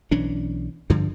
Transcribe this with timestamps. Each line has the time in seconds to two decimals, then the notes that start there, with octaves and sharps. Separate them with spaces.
0.11 B1 E3 C#4 D4
0.90 G2 D3 F3